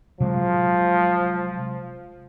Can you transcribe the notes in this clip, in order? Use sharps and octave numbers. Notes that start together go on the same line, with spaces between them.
C3 F3 F#3 G#3